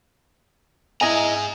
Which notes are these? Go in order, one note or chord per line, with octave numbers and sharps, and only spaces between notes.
E4 G#4 D#5 G#5 A#5